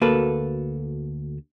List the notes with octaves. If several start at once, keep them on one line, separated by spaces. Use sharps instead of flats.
D2 A#3 F#4 A4 B4